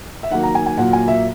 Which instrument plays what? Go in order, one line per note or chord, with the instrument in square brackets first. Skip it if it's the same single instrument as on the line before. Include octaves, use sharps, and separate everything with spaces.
[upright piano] E5
D#3 F#3 A#3 F#5
A#5
G#5
G#5
A#2 F#3 A#3 F#5
G#5
E5